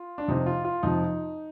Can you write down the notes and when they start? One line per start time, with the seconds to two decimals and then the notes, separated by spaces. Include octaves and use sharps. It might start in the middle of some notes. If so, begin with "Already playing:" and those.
Already playing: F4
0.18 D4
0.28 F2 C3 F3 D#4
0.46 F4
0.65 F4
0.83 F2 C3 F3 D#4